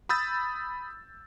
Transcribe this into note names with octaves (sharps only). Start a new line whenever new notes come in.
B5 D#6 E6 G6 A6